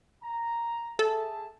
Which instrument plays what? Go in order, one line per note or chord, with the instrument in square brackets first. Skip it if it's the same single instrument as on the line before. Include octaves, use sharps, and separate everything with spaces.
[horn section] A#5
[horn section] G#4 E5 A5 [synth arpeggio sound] A4